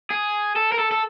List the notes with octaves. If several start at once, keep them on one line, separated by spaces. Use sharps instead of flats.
G#4
A4
A#4
A4
A4